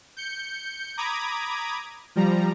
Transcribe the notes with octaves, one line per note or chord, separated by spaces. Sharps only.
G6 C#7
A#5 B5 D6 D#6 G#6
F3 G3 A#5